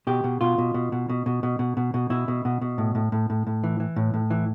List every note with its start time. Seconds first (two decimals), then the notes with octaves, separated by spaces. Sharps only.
0.07 B2 G4
0.24 B2
0.41 B2 F4
0.58 B2
0.74 B2
0.92 B2
1.10 B2
1.26 B2
1.43 B2
1.59 B2
1.77 B2
1.94 B2
2.10 B2 E4
2.28 B2
2.45 B2
2.62 B2
2.78 A2
2.95 A2
3.12 A2
3.30 A2
3.47 A2
3.64 E3
3.80 E3
3.96 A2
4.14 A2
4.30 E3